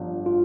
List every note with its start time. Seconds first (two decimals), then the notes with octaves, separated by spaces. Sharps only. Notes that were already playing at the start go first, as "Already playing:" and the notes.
Already playing: G1 G2 F3
0.26 F4